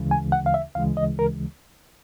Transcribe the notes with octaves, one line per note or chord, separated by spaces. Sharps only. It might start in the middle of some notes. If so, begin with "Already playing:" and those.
Already playing: D2 C#3 E3 G#3
G#5
F#5
F5
E5
D2 C#3 E3 G#3 F5
D#5
A#4